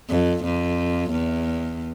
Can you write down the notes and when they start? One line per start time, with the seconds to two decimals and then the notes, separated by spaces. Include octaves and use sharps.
0.10 F2
0.44 F2
1.11 E2